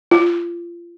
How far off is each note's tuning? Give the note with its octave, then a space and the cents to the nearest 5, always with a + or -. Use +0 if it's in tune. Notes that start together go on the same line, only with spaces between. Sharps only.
F4 -25